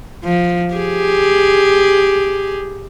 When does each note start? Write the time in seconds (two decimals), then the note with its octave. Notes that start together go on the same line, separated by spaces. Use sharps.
0.24 F3
0.74 G4 G#4